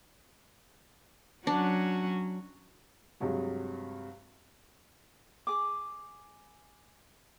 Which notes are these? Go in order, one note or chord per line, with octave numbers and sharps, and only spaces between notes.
F#3 C#4 D4 F#4
G2 C3 F#3 G#3
G#4 D6